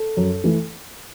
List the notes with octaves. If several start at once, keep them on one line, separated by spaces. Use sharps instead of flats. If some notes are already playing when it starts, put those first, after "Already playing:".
Already playing: A4
F#2
E3 A3